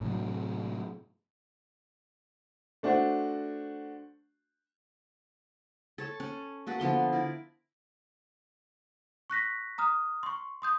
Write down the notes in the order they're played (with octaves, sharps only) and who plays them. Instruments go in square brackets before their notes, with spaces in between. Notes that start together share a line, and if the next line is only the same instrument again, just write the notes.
[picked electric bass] A2 C3 F#3
[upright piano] A3 D4 F#4 C5
[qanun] A4 C#5 A5
C#4
A#3 F#4 A4 B4
D3 F3 B3 C6
E4 A#4 D5
[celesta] C#6 F#6 A#6 B6
A#5 D#6 F6
C6 C#6
C6 D#6 G6